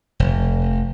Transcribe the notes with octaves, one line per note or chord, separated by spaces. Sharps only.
F1